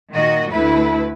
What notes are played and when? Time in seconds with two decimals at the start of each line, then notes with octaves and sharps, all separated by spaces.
0.12 A#2 D#3 F#4 D#5
0.51 D2 A3 E4 B4